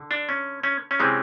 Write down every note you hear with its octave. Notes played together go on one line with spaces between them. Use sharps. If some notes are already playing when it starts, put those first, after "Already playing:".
Already playing: D3
D4
C#4
C#4
C#4
C3 E3 G#3 C4